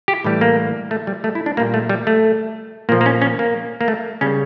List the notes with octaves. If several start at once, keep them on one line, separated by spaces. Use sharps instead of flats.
G4
A2 E3 G3
A#3
A3
G3
A3
E4
D4
A#2 G3 A#3
A3
G3
A3
A#2 F3 A#3
A#3
C#4
C#4
A#3
A#3
A3
C#3 G3 C#4